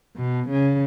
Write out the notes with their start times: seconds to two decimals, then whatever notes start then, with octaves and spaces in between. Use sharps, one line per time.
0.17 B2
0.50 C#3